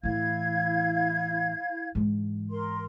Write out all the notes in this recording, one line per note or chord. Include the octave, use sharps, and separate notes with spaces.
A2 E3 E4 F5 G#6
G#2 E3
A#4 C6